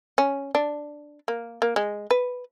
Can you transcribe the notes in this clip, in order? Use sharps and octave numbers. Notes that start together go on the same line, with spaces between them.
C#4
D4
A#3
A#3
G#3
B4